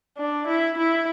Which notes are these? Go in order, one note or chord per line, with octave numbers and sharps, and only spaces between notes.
D4
E4
E4